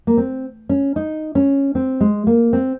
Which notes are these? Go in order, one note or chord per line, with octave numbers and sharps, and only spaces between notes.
A#3
C4
C#4
D#4
C#4
C4
G#3
A#3
C4